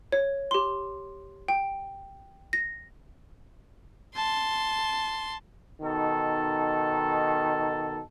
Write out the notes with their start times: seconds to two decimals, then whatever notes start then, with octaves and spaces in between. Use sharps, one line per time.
0.12 C#5
0.51 G4 C6
1.48 G5
2.53 A#6
4.16 A5 C6
5.81 B2 D#3 D#4 A4